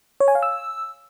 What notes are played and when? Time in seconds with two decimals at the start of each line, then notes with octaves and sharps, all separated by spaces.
0.20 C#5
0.28 G#5
0.35 F5
0.43 E6